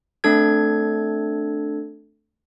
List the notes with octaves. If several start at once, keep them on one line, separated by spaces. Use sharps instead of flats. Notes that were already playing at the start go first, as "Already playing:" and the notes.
A3 C4 D4 A4 G#6